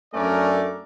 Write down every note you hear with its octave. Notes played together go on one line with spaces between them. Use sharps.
F#2 A3 C#4 D4 A#4 D5